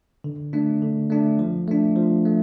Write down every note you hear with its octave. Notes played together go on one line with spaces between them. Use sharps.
D3
A3 D4
D3
A3 D4
F3
A3 D4
F3
A3